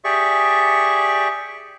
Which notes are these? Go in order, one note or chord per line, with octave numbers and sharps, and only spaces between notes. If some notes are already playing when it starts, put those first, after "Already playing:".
G4 G#4 D5 E5 C#6